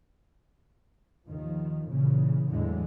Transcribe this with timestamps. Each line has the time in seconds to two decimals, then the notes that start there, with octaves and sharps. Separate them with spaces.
1.26 D#2 D#3 F3
1.87 A#2 C#3 E3
2.49 E2 A2 D3 E3 F#3 G#3